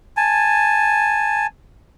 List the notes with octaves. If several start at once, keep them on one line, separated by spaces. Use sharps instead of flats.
G#5 A5